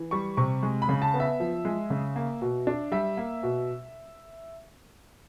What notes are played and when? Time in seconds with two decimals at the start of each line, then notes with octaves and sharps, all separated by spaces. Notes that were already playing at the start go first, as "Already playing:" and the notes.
Already playing: E3
0.11 G3 C#6
0.37 C3 C#6
0.63 G#3
0.82 B5
0.89 C#3
1.02 A5
1.14 B3
1.20 E5
1.40 F3
1.65 G#3
1.90 C#3
2.16 A#3
2.42 B2
2.67 D4
2.92 G3 E5
3.17 A#3
3.43 B2